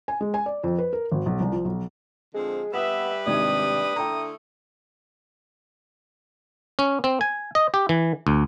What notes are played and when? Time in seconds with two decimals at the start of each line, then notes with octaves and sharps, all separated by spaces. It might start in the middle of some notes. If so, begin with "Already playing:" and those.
0.08 G#5
0.21 G#3
0.34 G#5
0.46 D5
0.64 F2
0.78 B4
0.93 A#4
1.11 G#1
1.26 B1
1.40 C2
1.52 F3
1.65 B1
2.34 D3 F3 G#3 C4
2.73 G3 B3 B4 E5 F#5 D#6 E7
3.26 G#1 C3 D4 D#6 G#6
3.96 D3 A3 E4 G5 A#5
6.79 C#4
7.04 C4
7.21 G#5
7.55 D#5
7.74 G4
7.89 E3
8.27 D2